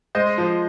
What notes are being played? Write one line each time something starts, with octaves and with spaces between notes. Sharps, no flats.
G#3 C5 D#5
F3